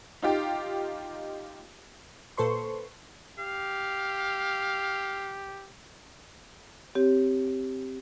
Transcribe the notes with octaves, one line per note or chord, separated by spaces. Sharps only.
D#4 F4 G4
A#2 A4 B4 C5 C6 C#6
G4 F5
C4 G4 C#5